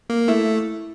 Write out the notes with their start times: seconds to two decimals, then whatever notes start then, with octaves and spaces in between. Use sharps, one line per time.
0.10 A#3
0.28 A3 E4